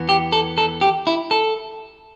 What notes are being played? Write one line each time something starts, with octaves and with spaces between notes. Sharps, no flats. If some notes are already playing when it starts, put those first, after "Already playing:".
Already playing: E2 E3 B3
G4
A4
A4
G4
E4
A4